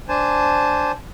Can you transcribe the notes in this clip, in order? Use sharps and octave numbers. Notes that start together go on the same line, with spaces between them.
D4 C5 G#5 A5